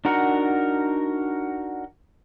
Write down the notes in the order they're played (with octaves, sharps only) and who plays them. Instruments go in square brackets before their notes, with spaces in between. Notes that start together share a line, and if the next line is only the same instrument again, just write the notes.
[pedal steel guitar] D4 D#4 F#4 A#4 F#5